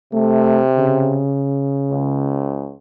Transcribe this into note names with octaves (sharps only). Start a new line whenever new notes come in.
C3 A3
C#3
C#2